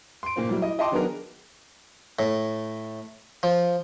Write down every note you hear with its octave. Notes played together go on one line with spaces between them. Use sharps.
C6 D7
A#2 A#3 F4 C5
F#3 G3 E4
E4 D#5
F4 D#5 G5 A5 C6 D6
D#3 F#3 B3 D4 G#4 A#4
A2
F3